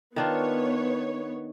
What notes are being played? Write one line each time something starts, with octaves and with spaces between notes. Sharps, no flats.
D#3 B3 D4 F4 C#5